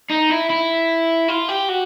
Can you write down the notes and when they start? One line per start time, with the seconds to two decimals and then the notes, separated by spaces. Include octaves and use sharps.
0.10 D#4
0.30 E4
0.50 E4
1.29 F4
1.49 G4
1.69 F#4